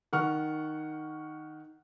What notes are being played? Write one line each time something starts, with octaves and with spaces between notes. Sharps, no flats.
D#3 F#5 C#6 F6